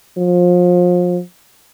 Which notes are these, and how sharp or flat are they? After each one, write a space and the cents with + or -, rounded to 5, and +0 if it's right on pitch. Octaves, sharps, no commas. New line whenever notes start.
F3 +30